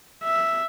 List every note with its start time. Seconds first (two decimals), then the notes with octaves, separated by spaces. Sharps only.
0.23 E5